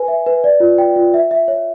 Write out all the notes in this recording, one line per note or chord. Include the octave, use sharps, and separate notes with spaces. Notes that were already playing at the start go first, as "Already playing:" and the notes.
Already playing: B4 G#5
E5
B4
D5
F4
G5
F4
E5
E5
C#5